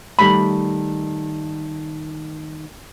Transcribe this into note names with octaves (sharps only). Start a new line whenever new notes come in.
D#3 G3 A3 B5